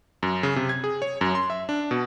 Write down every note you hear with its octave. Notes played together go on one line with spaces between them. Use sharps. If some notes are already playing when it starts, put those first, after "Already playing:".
F#2
C#3
C3
G#6
G#4
C#5
F#2
C6
E5
D4
B2